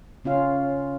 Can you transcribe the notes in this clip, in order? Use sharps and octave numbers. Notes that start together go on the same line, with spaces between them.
C#3 C#4 F4 F5